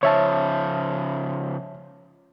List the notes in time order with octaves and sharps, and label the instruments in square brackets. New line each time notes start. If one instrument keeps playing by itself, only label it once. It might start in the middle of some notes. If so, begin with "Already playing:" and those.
[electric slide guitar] C#3 F3 [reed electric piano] C#5 E5 A5